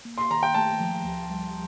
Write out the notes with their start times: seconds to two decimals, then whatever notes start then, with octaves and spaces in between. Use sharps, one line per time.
0.05 A#3
0.18 C6
0.30 D#3 A#5
0.43 G5
0.54 A3 A5
0.80 F3
1.04 D2
1.30 G3